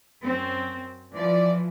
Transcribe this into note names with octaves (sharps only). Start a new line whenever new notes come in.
F#2 C4
E3 F3 D5